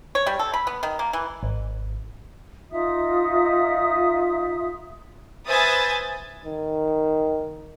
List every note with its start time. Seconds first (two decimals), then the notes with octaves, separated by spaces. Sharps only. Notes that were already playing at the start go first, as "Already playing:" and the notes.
0.15 C#5
0.27 G3
0.39 A4
0.54 B5
0.67 B3
0.83 D#3
0.99 A#3
1.13 E3
1.43 G#1
2.70 D#4 F4 E5 D#6
5.46 B4 C5 E5 G#5 D#6 A6
6.45 D#3